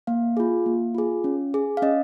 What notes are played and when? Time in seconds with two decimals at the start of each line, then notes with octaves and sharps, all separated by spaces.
0.07 A#3 F5
0.37 F4 G#4
0.66 A#3
0.95 F4 G#4
1.24 C#4
1.54 G#4
1.77 F5
1.82 C#4 D#5